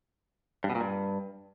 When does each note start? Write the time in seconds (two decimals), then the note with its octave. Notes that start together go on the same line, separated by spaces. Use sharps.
0.64 G2
0.70 B2
0.75 A#2
0.81 G2